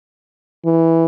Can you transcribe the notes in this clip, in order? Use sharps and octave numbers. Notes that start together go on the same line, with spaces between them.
E3